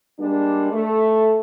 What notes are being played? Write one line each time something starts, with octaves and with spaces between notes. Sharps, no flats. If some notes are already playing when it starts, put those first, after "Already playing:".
G3 G#3 A#3 D4
A3